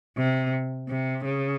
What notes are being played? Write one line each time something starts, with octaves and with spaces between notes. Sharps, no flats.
C3
C3
C#3